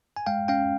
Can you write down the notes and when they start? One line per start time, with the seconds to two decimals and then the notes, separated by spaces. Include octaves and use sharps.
0.16 G#5
0.26 G#3 F5 G5
0.48 C#4 F5 G5